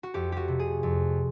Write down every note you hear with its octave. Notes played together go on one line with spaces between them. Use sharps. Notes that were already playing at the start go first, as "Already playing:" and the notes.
F#4
F2 G4
F#4 G4
C3
G#4
F2